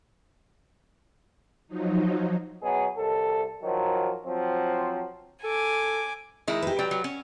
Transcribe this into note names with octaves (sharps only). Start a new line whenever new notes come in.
F3 F#3 D#4
B2 F#3 B3 G#4
C2 A4
D#3 F3 F#3
F3 F#3 C4
A4 G#5 D6
D#3 G#3 E4
G4 B4
F#3 D5 G5
F#3
C#4